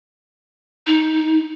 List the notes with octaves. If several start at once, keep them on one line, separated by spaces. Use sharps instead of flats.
D#4